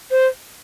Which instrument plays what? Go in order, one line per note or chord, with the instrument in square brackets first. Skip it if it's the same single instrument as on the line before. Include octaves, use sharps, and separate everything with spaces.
[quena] C5